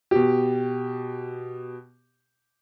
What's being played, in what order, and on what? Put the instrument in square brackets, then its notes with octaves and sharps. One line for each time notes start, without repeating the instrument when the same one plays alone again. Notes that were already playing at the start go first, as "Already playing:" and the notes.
[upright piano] B2 G4